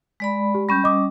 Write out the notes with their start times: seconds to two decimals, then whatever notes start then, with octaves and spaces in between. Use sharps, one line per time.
0.20 G#3 D5 B5
0.54 G4
0.69 G3 C#4 B5 C#6 G6
0.84 D#5 D6 D#6